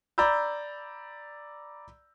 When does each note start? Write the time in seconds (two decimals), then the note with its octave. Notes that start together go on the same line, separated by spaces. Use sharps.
0.18 D5 A#5 B5 E6 G6